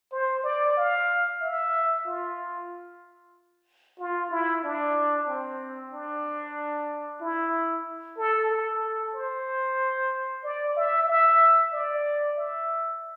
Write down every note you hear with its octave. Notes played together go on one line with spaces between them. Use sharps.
C5
D5
F5
E5
F4
F4
E4
D4
C4
D4
E4
A4
A4
C5
D5
E5
E5
D5
E5